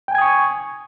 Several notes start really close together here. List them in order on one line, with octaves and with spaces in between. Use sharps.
G5 G#5 G#6 D#6 C#6